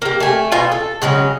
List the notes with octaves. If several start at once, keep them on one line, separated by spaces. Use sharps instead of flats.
A#3 G4
A3 G#5
B2 F4 G#5
A4
C#3 F#3 G#3 C#4